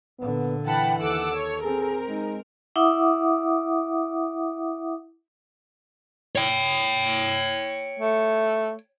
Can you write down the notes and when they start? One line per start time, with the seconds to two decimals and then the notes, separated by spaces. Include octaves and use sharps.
0.19 A#2 D3 B3
0.66 E3 F#5 G5 A5 B5
1.00 D#2 A4 F#5 D6 E6
1.35 C#5
1.63 C4 G#4 A#4
2.08 G#3 D#4
2.76 E4 E5 F#5 D6 D#6
6.35 C#5 G5
7.99 A3